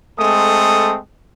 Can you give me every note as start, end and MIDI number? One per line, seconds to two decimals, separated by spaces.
0.18 0.97 56
0.18 0.97 57
0.18 0.97 60
0.18 0.97 69
0.18 0.97 87